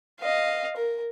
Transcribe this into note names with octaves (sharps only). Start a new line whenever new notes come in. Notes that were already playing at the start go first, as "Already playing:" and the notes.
D#5 F5
A#4